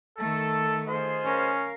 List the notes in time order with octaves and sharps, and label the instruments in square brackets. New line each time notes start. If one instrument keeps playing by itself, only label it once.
[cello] D#3 A3 [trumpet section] A4
[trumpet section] F4 G#4 D#5 [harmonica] C5
[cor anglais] C#4 [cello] A#4 F5